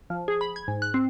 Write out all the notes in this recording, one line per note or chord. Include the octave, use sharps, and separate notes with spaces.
F3
G#4
B5
G#6
G#2
F#6
C4